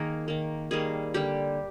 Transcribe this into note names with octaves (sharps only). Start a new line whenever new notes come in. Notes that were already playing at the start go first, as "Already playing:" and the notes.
Already playing: D#3 A#3 G#4 A#4
D#3 A#3
D#3 G3 A#3 G#4
D3 G3 A#3 G4